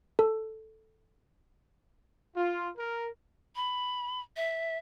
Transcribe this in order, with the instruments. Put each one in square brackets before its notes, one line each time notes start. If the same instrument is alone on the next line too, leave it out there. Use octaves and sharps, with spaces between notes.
[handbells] A4
[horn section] F4
A#4
[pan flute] B5
E5